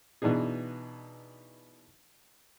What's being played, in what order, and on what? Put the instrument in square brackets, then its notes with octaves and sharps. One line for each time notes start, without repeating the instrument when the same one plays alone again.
[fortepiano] B2 E3 D4 D#4 G#4